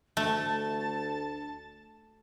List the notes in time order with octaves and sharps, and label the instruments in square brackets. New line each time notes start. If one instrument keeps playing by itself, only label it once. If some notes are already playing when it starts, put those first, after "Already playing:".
[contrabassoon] D2 [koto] A3 [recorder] A5